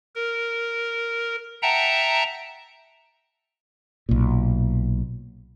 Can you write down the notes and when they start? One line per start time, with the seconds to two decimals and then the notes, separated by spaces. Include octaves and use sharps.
0.15 A#4
1.62 E5 F#5 G5 A5 A#5
4.09 B1 A#2